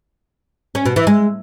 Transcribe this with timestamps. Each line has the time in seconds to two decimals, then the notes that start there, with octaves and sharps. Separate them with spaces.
0.75 C#4
0.86 B2
0.96 E3
1.07 G#3